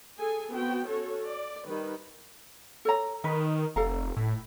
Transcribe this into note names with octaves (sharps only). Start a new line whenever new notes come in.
G#4 A4 G#5
B3 C4 F#4 G5
C#4 F#4 A4 C#5
D5
D#3 G3 B4
A4 C#5 A#5
D#3 D#4 B4
F1 A4 F5 A#5
A2 E4